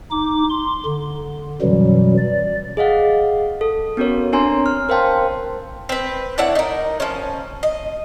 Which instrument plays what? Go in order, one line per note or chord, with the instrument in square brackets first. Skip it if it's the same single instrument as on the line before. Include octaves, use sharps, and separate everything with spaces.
[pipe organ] D#4 D6
C6
D3
F#2 B2 E3 F#3 G3
D5
[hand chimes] G#4 D#5 F5 F#5
A4
B3 C#4 F#4 A#4 C#5
C4 D4 C#5 G#5 A#5 C6
F6
A#4 C5 F5 G5 A5 C6
[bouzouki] C4 B4
D4 E4 C#5 F#5
D#4 A#4
F3 C#4
D#5